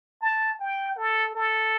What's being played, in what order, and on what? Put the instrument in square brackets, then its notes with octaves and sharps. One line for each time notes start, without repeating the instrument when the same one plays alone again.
[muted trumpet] A5
G5
A4
A4